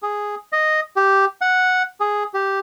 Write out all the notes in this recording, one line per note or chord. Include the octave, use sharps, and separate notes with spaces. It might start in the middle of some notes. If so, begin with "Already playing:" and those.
G#4
D#5
G4
F#5
G#4
G4